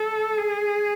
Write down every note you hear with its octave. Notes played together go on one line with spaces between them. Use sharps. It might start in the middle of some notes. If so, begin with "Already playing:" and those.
Already playing: A4
G#4